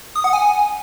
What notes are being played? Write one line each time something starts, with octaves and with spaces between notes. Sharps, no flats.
D#6
F#5
G#5